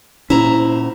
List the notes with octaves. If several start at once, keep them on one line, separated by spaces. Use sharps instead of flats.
A#2 C#4 E4 C5 A#5